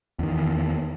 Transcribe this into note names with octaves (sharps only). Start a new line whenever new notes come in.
E2 D#3